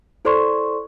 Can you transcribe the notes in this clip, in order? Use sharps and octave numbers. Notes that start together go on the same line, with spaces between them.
E4 A4 C5 D5 C6 C#6